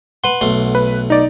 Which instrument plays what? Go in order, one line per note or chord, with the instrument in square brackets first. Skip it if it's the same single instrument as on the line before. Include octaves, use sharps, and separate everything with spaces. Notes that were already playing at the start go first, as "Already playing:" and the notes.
[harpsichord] B4 C6 [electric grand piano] F#5
[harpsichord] B1 A3 C6
[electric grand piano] B4
D#4 D5